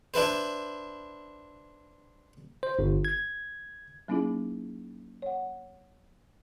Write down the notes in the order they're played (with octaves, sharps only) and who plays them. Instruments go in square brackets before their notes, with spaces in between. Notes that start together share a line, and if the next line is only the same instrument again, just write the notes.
[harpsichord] D4 E4 B4 C5
[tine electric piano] C5
G1
G#6
[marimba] F#3 A#3 C#4 D#4 E4 G#4
C#5 F#5